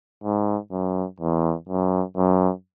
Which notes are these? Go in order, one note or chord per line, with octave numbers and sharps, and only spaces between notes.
G#2
F#2
E2
F#2
F#2